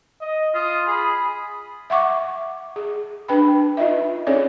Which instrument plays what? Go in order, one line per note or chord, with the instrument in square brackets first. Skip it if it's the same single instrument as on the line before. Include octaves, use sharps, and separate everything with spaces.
[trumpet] D#5
[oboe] F4 [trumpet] D#6
[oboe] G#4 [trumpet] B5
[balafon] E5 F#5 C#6 D6
G#4
D4 B4 G5 B5
D#4 F4 D#5 E5
C#4 D#4 G#4 A4 C#5 D5